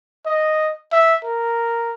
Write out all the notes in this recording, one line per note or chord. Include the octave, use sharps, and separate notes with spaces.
D#5
E5
A#4